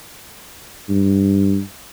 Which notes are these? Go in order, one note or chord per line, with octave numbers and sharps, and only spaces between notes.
G2